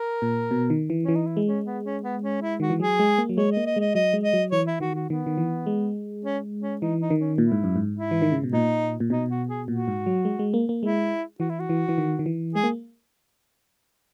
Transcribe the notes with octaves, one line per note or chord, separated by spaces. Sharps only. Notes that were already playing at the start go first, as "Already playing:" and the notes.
Already playing: A#4
A#2
B2
D#3
E3
E3 C#4
D#4
E4
G#3
C#4
B3
C#4
B3
C#4
E4
D#3 F#4
E3
F#3 G#4
G#3
A#3
F#3
G#3 C#5
A#3 D#5
D#5
G#3 D#5
F#3 D#5
G#3
D#5
F#3
E3 C#5
E4
D#3 F#4
F#4
D#3 B3
D#3
E3
G#3
C#4
C#4
E3 D#4
D#4
D#3
C#4
A#2 E4
G#2
F#2
G#2
E4
E3
D#3
C#3
B2
A#2 D#4
A#2
B2 D#4
F#4
G#4
A#2 F#4
G#2
F#3
G#3
G#3
A#3
A#3
G#3 E4
E3 F#4
E4
F#4
E3
E3
D#3
D#3
E3
G#3 G#4
A#3